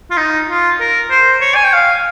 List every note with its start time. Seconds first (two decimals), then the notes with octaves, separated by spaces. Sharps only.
0.11 F4
0.17 D#4
0.49 F4
0.80 A#4
1.10 C5
1.41 C#5
1.55 G#5
1.64 G5
1.73 F5